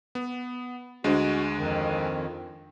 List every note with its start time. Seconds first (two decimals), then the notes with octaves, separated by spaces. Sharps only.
0.15 B3
1.04 D2 G#3 D4 F#4 C5
1.58 F2 D#3